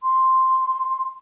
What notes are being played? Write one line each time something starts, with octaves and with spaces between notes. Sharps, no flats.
C6